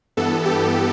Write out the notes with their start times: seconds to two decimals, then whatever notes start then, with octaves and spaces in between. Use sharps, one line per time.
0.17 G2 E3 B3 A4
0.45 G4